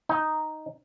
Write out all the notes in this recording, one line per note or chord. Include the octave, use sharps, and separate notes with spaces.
D#4